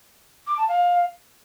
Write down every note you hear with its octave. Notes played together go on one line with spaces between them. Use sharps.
D6
A5
F5